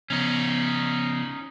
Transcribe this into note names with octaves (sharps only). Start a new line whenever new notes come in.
C#3 F3 B3 C#4 D#4